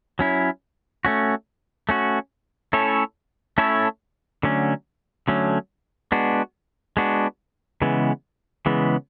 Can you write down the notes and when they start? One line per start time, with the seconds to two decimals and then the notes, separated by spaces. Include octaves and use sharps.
0.19 F#3 C#4 E4
1.05 A3 C#4 F#4
1.89 A3 C#4 F#4
2.73 A3 C#4 E4 A4 C#5
3.58 A3 C#4 E4 A4 C#5
4.43 D3 F#3 A3 C#4
5.28 D3 F#3 A3 C#4
6.12 G#3 B3 D4 F#4
6.97 G#3 B3 D4 F#4
7.82 C#3 E3 G#3 B3
8.66 C#3 E3 G#3 B3